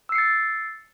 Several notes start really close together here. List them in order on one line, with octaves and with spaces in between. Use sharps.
E6 C7 C#7 A6